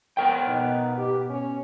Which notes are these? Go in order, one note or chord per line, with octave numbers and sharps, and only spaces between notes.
B3 A#4 G5
B2 D#4
G4
C#4